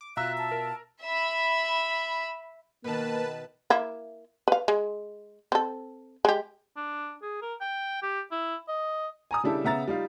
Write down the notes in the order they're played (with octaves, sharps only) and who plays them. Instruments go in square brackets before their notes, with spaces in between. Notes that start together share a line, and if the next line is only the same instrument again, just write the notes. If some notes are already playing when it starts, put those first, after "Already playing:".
[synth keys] D6
[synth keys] B2 F4 [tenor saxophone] E5 [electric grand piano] F5 A#5 E6 [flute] F#6
[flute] A5
[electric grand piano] A#4
[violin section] E5 B5
[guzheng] B2 D#3 [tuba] A#3 [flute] A#4 [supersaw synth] B4 A5
[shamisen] A#3 E4
B4 F5
G#3
C4 A4
G#3 G4
[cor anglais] D4
G#4
A#4
G5
G4
E4
D#5
[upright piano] G#5 A#5 D#6
C#3 G3 D4 E4 G4 A4
C#3 B3 E5 A#5 A6
G3 D#4 F4